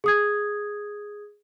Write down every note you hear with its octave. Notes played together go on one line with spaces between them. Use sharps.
G#4 D#6 G#6